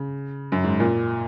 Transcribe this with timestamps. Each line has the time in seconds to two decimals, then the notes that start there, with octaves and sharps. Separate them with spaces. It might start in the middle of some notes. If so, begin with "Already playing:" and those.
Already playing: C#3
0.52 F#2
0.63 G#2
0.80 A#2